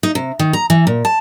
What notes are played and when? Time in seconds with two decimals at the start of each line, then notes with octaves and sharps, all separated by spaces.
0.03 D#4
0.15 C3
0.39 D#3
0.53 A#5
0.70 E3
0.87 A#2
1.05 A5